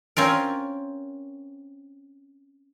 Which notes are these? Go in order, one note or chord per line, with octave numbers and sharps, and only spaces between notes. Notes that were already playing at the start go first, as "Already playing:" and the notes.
C4 C#4 F4 A#4